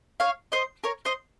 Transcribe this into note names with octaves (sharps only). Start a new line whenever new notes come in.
C#5 F5
C5 D#5
A#4 C#5
C5 D#5